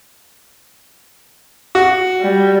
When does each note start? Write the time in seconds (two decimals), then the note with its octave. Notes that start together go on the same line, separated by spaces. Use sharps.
1.75 F#4
2.21 G3